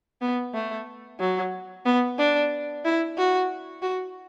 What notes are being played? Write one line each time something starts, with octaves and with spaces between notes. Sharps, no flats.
B3
A3
F#3
B3
D4
E4
F#4
F#4